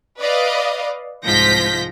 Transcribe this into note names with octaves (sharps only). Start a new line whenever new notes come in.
B4 D5 D#5 F5
C2 G#2 F3 G6 A#6 B6